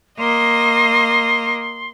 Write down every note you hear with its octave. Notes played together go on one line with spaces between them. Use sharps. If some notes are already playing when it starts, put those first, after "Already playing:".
A#3 D#5 C6